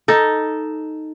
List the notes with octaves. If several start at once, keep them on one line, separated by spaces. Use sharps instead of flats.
D#4 A4